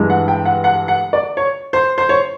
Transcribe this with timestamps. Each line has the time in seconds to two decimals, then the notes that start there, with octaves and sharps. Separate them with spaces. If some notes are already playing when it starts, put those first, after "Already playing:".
Already playing: G2 E3 G#3
0.10 F#5
0.28 G5
0.45 F#5
0.64 F#5
0.88 F#5
1.13 D5
1.37 C#5
1.73 C5
1.98 C5
2.09 C#5